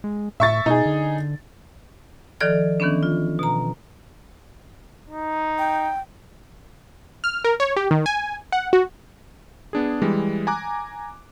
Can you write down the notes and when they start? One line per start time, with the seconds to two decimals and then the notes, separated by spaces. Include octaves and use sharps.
0.04 G#3
0.40 A2 E5 C#6 A6
0.66 B2 D#4 G#4
0.86 D3
2.40 D#3 F3 A4 D5 F6
2.80 D#3 E3 B3 C#4 D4
3.03 F4
3.39 B2 A#5
5.10 D#4
5.59 G5
7.24 F6
7.44 A#4
7.60 C#5
7.76 G4
7.91 D#3
8.06 G#5
8.52 F#5
8.73 F#4
9.73 B3 D4 G#4
10.02 E3 G3 G#3
10.47 G#5 A#5 D6 F#6